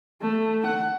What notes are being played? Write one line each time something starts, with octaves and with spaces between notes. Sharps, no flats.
A3
F#5